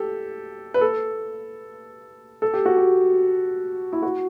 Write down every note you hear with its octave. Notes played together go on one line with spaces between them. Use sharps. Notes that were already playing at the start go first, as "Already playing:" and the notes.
Already playing: G4 A4
B4
A4
A4
G4
F#4
G4
E4
F#4